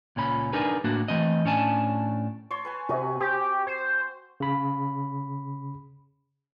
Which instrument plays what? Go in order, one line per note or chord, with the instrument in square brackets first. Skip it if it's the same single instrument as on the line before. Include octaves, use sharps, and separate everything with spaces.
[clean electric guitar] C#2 A#2 C#4 B5
D4 D#4 G#4 A#4 B4
A2 A#3 D4 F#4
E3 A3 C4 D#5
A2 C#4 D4 G#5 A5
[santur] C#5 A5 C6
B4 G#5 A5
[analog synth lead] C3 [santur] F#4 G#5
[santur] C4 [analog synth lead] G4
[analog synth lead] C5
[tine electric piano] C#3 B5